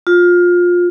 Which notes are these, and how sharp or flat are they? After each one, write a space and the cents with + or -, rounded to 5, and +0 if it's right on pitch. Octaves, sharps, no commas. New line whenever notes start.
F4 +20